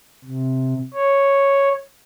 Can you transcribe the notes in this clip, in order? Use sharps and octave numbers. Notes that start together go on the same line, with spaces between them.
C3
C#5